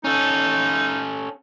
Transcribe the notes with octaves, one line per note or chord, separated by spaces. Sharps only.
C#4 D#4 A4